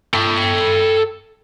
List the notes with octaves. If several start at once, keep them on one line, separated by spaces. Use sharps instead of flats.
A4 G5